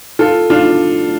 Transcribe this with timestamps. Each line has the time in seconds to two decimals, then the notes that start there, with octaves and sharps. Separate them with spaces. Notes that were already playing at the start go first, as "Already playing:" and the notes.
0.19 F4 A4
0.50 D4 F4